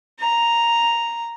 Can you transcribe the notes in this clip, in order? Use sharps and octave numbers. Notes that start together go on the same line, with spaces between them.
A#5